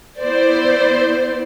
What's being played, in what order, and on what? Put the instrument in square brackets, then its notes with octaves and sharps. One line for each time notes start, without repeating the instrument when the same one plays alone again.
[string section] B3 E4 C5 D5